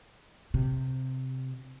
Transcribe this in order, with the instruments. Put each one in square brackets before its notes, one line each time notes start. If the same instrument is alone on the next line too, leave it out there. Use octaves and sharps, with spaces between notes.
[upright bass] C3